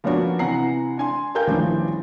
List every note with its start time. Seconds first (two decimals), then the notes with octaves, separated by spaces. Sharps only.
0.04 F3 A#3 B3 C#4 D4 F#4
0.39 C3 E3 F#5 A#5 C7
0.98 D4 G#5 C6
1.35 G4 A#4 F5 G5 G#5 G6
1.48 D#1 A1 E3 F3 G3 D4